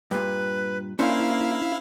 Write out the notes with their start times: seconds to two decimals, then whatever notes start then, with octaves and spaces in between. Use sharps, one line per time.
0.11 G2 A#2 B4
0.99 A#3 C#4 D4 E4 C5 F5